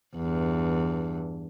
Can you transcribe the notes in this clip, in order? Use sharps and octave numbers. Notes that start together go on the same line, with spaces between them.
E2 G2